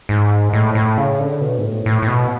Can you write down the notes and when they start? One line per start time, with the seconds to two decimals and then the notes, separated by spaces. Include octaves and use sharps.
0.09 G#2
0.53 A2
0.75 A2
0.98 C#3
1.19 D3
1.41 B2
1.58 G#2
1.64 A2
1.86 A2
2.02 A2
2.08 B2